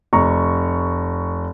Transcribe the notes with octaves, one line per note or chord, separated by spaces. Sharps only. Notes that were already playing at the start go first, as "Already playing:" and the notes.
F1 A#5 C#6